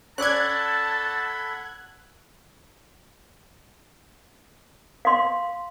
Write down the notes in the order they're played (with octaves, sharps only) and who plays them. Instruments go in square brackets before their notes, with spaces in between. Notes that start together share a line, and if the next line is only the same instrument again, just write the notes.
[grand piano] C#4 D5 [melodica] A4 F#5 B5 [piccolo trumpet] A5 [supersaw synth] F#6 G#6
[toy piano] F5 C6